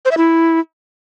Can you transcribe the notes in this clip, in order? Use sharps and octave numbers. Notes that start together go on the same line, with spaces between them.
C5
E5
E4